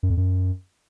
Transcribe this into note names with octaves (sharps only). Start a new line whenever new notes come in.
F#2
F2
F#2